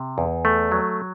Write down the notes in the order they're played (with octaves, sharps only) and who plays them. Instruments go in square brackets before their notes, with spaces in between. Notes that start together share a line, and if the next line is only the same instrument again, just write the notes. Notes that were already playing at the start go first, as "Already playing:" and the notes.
Already playing: [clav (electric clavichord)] C3
E2
A3
F#3